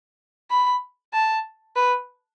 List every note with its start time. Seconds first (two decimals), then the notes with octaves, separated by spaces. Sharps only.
0.50 B5
1.13 A5
1.76 B4